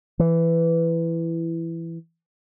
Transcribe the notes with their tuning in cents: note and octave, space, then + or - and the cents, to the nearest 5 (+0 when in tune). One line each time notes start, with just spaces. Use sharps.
E3 +10